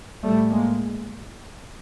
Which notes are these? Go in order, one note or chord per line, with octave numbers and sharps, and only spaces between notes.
A2 G3 A3
G#3 A#3